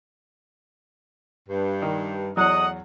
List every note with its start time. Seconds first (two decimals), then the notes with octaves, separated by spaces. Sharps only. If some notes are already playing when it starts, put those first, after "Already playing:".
1.49 G2
1.82 D#3
2.37 E2 F#3 A3 D#5 F#5 D#6